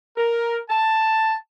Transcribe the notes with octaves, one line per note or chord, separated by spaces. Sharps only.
A#4
A5